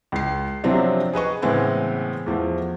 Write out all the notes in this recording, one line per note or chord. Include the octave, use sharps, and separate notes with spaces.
C#2 C7
C3 F3 F#3 C4 D4
G#4 B4 D#5 C#6
A2 C#3 E3 G#3 B3 C4
E2 F3 A3